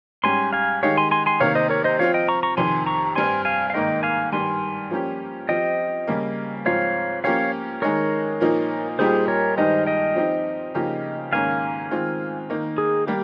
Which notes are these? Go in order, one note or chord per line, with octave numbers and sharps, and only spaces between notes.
G#2 G3 C#4 G4 G#5 C6
F5 G#5
D#3 G#3 D#4 G4 C#5 F5
G#5 C6
G#5 C6
G#5 C6
C3 D#3 A#3 C#5 F5
C5 D#5
A#4 C#5
C5 D#5
F3 C4 F4 C#5 F5
D#5 G5
A#5 C#6
A#5 C#6
F2 C3 D#3 G#5 C6
A#5 C#6
G2 G3 C4 G#5 C6
F5 G#5
F5
G#2 D#3 A#3 D#5 G5
F5 G#5
G2 D#3 G3 G#5 C6
F3 A#3 C#4 G4
F3 C4 G4 D#5 G5
C#3 G3 A#3
G#2 F3 C4 F4 C#5 F5
F3 A#3 C#4 G4 C#5 F5
D#3 G#3 D#4 A#4 C#5
A#2 F3 A#3 D#4
A#2 G3 A#3 D#4 G4 G#4 C5
A#4 C#5
G2 D#3 G#3 D#4 G4 C5 D#5
D#5 G5
F3 C4 D#4 G4
C#3 F3 A#3 D#4 G4
G#2 D#3 A#3 C#4 F5 G#5
D#3 G#3 C4 F4
D#3 A#3 D#4
G#4
G3 A#3 G4